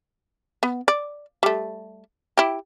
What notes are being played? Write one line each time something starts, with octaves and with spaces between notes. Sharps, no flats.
B3
D5
G3 A3
E4 G4